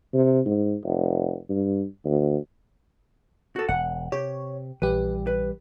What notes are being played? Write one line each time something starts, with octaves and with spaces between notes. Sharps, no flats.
C3
G#2
F1
G2
D2
F#4 A4
E1 F#5
C3 G4 C#5
A#1 E3 G3 G4 B4
B4